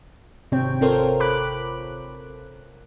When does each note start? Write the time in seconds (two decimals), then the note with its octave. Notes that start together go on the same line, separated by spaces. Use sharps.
0.52 G#1 C3 C4 C#5 G5
0.81 C4 F4 A4 A#4 C5 C#5
1.20 B5 D6 F#6